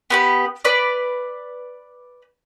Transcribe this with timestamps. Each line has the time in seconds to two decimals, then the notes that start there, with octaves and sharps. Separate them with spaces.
0.10 B3 G4 B4
0.65 B4 D5